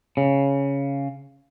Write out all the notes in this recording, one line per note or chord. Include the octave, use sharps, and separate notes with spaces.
C#3